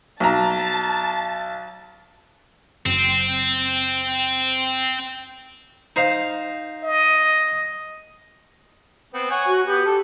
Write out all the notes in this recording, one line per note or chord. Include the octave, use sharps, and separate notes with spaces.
B1 A5 A#5
F#1 C4
D#4 C5 F5
D#5
B3 C4
C#5 F#5 G#5
F#4
B3 G4
A4